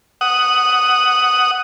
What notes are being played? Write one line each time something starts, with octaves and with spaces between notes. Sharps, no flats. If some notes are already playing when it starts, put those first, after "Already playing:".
F#5 D#6